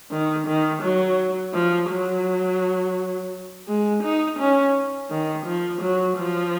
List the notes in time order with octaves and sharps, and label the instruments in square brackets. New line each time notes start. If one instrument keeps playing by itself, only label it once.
[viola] D#3
D#3
F#3
F3
F#3
G#3
D#4
C#4
D#3
F3
F#3
F3